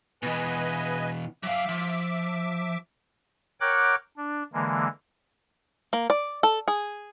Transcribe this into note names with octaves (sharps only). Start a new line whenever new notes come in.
B2 E3 B4 D#5 G#5
F#3 E5 F5 D6
F3
A#4 C#5 F#5 G5 D6 F#6
D4
D3 E3 G#3 A#3
A#3
D5
A4
G#4